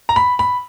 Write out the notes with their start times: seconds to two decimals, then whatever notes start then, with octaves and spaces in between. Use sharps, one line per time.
0.09 A#5
0.16 B5
0.39 B5